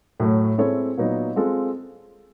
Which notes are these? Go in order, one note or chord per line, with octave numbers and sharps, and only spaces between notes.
A2 F#3 A3
G#3 C4 E4 A4 C#5
A#2 F#3 B3 D#4
G#3 C4 F4 A4